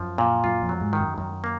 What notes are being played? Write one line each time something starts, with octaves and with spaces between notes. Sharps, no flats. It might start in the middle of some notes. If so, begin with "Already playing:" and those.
Already playing: F#2 F3
A#2
F#2 F4
F2
F#3
G#2
D#3
F#2
F#2 D#3
A#3